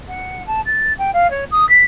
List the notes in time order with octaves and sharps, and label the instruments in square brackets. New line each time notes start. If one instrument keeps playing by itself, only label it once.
[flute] F#5
A5
A6
G5
F5
C#5
D#6
B6